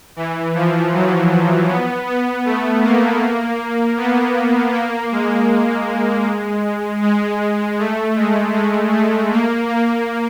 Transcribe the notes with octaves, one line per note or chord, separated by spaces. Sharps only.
E3
F3
F#3
B3
B3
A3
A#3
B3
A#3
G#3
G#3
A3
G#3
G#3
A3
A#3
A#3